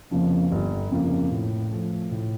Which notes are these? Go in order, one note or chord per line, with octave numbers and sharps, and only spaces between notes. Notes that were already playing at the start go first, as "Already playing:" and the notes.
F2 C#3 F3 A#3
G1
F2 C#3 F3 A#3
A2
F3 A3
A2